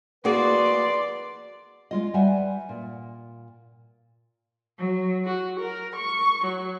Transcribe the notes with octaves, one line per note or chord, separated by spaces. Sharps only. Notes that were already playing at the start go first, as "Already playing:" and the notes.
A#3 F#4 G#4 B4 D5 C6
G#3 F4 D#5
G3 B4 E5 F#5 G#5
A#2
F#3
F#4
A#4
C#6
F#3